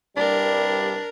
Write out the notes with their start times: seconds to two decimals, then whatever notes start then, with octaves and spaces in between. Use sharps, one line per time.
0.17 C2 G2 G3 D4 A#4 D5